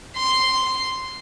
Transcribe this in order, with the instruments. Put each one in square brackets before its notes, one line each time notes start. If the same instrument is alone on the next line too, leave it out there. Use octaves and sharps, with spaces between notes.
[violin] C6